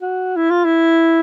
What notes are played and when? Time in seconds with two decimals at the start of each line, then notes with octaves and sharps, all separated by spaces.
0.02 F#4
0.36 E4
0.51 F4
0.65 E4